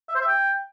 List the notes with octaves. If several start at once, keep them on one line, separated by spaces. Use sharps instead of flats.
E5
C5
E5
G5